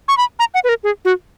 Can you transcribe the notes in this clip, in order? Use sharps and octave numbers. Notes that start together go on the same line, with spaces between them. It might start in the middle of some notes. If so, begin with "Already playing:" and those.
C#6
B5
A#5
F#5
B4
A#4
G#4
F#4